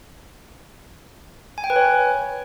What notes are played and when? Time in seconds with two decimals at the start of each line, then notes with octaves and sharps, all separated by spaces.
1.58 G#5
1.64 G5
1.70 B4
1.76 C#5